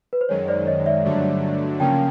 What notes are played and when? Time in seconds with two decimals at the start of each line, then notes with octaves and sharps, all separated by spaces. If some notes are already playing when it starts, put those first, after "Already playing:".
0.13 B4
0.21 C5
0.29 F#2 D#3 G#3 C#5
0.48 C5 D5
0.67 C#5 D#5
0.86 D5 E5
1.05 G2 D3 F#3 A3 D4
1.80 C#3 F3 A#3 C#4 G5 A5